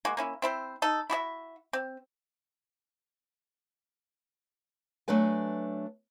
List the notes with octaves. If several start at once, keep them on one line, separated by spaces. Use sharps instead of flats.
G#3 A#3 F#4
A#3 C#4 E4
C4 E4 A4 C5
D#4 A4
E4 F#4 G#4 E5
C4
F#3 A3 B3 D4 B4 G#5